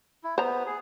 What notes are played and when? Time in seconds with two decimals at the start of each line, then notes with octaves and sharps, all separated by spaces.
0.24 E4
0.38 B3 C5 A#5
0.66 G#4